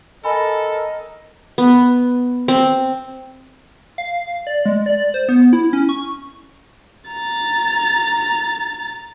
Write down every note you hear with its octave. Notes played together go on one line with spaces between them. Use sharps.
A4 A#4 D#5 G#5 B5
B3
C4
F5
D5
G#3
D5
C5
B3
E4
C#4
C#6
A#5 A6